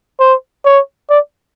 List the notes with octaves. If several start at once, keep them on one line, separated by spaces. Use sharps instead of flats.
C5
C#5
D5